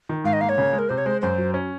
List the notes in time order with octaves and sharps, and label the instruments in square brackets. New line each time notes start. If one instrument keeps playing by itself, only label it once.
[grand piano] D#3
[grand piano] G#2 [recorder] F5
[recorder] D#5
[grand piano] A#3 [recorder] F5
[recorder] C#5
[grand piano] C#3
G#3
[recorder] A#4
[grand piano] C3 [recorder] C5
[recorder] C#5
[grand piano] G#3 [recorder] C5
[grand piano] F#2 [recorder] C5
[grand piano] F#3
C#4